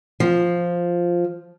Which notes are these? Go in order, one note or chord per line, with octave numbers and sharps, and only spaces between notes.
F3